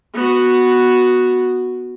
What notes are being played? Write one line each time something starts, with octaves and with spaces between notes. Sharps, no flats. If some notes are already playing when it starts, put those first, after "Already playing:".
B3 F#4